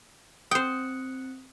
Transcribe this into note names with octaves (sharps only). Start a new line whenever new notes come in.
C4 C5 G5 D#6 F#6 C#7